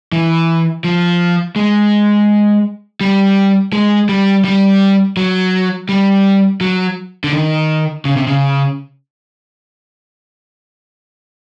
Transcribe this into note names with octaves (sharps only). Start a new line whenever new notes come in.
E3
F3
G#3
G3
G#3
G3
G3
F#3
G3
F#3
D3
D#3
C#3
C3
C#3